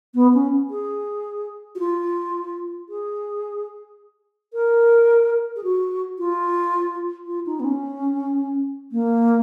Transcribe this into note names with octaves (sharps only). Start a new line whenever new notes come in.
B3
C#4
G#4
F#4
F4
G#4
A#4
G#4
F#4
F4
F4
D#4
B3
C#4
A#3